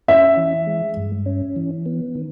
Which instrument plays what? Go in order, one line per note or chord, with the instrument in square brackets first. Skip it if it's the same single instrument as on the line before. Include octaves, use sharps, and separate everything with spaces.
[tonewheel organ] C#4 [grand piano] E5
[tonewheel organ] E3
G#3
G2
C#4
E3
B3
D#3